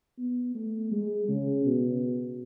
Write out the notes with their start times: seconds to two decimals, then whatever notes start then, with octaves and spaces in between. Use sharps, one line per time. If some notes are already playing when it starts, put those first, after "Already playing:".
0.18 B3
0.55 A3
0.92 G#3
1.29 C#3
1.65 B2